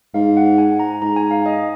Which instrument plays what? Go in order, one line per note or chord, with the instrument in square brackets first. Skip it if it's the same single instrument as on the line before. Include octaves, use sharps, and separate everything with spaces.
[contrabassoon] G#2 [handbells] F5
[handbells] F#5
G#5
A#5
[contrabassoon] G#2 [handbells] A#5
[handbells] G#5
F5
D#5